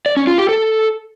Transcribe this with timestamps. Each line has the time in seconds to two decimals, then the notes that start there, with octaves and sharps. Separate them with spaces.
0.06 D5
0.17 C#4
0.27 F4
0.38 G4
0.49 A4